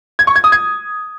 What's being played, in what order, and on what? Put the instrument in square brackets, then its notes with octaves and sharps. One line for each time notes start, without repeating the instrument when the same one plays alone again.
[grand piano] G#6
C#6
G#6
D#6
G#6